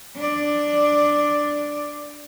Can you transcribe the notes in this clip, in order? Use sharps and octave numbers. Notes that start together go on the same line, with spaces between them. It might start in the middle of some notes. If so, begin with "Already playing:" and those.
D4 D5